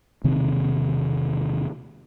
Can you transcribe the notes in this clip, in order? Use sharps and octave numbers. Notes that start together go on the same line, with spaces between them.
E1 C3 D#3 C4